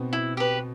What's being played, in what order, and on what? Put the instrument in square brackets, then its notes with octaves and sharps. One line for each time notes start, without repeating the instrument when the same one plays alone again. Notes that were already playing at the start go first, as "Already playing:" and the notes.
Already playing: [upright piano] B2 B3 C4
[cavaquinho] E4
G4 B4